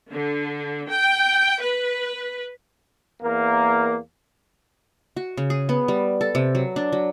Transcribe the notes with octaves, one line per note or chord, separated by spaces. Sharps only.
D3
G5
B4
E2 A#3
F#4
C#3
G#4
B3
G3
A4
C3
F#3
D4
F#3